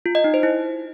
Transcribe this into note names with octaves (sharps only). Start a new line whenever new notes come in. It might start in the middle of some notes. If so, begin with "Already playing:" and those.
F4
D#5
D#4
C5
E4